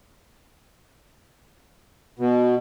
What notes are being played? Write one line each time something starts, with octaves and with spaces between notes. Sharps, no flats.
B2